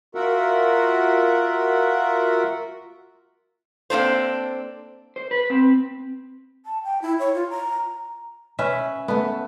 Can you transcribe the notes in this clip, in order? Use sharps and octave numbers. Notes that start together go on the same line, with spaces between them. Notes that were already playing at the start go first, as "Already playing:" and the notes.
F4 F#4 A#4 E5 F#5
A#3 C4 D4 A4 C5
C5
B4
C4
A5
G5
E4
C#5
F4
A#5
C#4 B4 E5
A3 B3